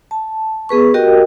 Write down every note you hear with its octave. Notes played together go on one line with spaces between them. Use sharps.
A5
B3 G#4 B4 C#6
F#4 G4 A#4 D#5 G5